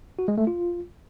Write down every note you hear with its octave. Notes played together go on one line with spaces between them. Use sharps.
F#4
G#3
A3
F4